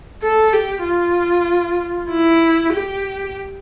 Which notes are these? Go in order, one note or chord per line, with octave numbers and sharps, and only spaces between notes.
A4
G4
F4
E4
G4